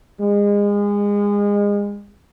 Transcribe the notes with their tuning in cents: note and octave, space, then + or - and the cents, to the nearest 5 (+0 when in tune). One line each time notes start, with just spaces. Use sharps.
G#3 -30